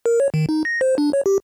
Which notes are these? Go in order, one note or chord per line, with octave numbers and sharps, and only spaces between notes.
A#4
C#5
D#3
D#4
A#6
C5
D4
C#5
G4